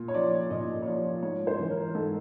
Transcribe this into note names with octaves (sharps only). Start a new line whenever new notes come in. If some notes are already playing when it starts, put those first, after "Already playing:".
Already playing: A#2
C#5
F3 D5
A#2 D#5
C#5
F3 D5
G#2 C#5
C5
E3
A#4
G#2 A4